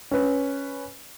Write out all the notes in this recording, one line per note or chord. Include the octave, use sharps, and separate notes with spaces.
C#4 B4